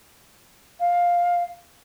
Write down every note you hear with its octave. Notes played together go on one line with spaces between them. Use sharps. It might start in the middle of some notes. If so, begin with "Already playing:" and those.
F5